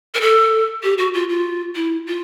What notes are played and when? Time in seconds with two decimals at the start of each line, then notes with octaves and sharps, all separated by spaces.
0.14 A#4
0.20 A4
0.83 G4
0.97 F#4
1.13 F4
1.28 F4
1.75 E4
2.06 F4